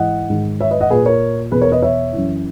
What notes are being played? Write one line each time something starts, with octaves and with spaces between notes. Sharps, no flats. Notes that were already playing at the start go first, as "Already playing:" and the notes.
Already playing: G#2 E3 D#5 F#5
G#2 D#3
C#5 E5
B4 D#5
D#5 F#5
A#2 G#4 B4
A#4 C#5
E2 B2 G#4 B4
A#4 C#5
B4 D#5
C#5 E5
F#2 E3